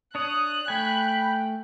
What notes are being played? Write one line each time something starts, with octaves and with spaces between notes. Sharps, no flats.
D4 C#5 D#6 F#6
A3 G5 G#5 B5